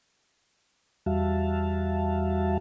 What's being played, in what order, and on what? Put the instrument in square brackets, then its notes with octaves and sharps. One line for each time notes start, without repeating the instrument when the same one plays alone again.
[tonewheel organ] E2 G3 F#4 E5 F5 A5